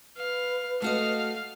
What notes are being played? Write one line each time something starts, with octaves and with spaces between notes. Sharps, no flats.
B4 F5
A3 F#4 D#5 F5